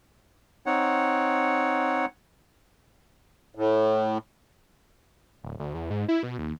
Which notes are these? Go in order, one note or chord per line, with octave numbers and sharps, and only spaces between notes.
C4 D#4 C#5 F#5
A2
D1
D2
E2
G#2
E4
B2
D#2